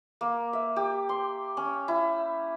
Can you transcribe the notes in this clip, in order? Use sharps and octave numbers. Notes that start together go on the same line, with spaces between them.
A#3
E5
G4
C6
C#4
E4